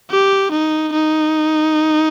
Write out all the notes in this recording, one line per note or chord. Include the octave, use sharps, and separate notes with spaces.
G4
D#4
D#4